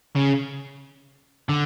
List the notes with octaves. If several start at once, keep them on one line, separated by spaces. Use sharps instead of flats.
C#3
D3